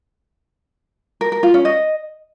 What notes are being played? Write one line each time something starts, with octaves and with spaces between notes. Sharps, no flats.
A#4
A#4
F4
C#4
D#5